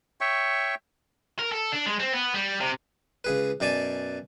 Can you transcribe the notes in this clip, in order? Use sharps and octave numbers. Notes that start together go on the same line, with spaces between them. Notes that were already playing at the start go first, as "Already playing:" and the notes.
C#5 E5 G5 C#6
A#4
A4
D4
G#3
C4
B3
G3
C3
C#2 G#4 B4
F#2 B2 D5 G#5 A5